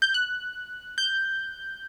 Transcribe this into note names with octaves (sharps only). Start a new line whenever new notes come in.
G6
F#6
G6